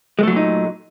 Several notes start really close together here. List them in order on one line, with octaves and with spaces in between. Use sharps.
G#3 A3 F#3 A#2 D#4